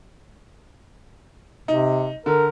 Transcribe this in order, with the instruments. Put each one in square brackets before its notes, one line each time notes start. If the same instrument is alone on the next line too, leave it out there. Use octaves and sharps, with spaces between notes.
[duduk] C3 [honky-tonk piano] D#4
[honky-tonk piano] D3 [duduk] A#4